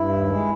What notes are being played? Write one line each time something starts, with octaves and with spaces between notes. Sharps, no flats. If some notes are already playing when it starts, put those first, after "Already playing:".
Already playing: G2 E4
D#2
G#3